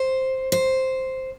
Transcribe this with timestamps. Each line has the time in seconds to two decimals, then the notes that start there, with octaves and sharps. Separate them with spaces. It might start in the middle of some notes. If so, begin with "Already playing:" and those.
Already playing: C5
0.52 C5